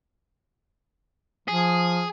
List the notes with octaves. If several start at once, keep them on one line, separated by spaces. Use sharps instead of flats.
F3 G#4